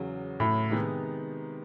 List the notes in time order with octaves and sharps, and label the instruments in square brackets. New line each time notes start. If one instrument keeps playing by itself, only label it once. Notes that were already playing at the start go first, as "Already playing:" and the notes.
Already playing: [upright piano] E2 C#3 F#3
[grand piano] A2
[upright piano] C3 D#3 G#3 B3 D#4